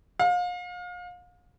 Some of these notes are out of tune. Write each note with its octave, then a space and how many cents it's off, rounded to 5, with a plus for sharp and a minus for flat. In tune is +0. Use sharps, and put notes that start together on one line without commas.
F5 +35